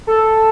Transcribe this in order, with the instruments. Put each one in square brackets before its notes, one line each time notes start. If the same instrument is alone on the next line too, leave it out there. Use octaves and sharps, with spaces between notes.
[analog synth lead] A4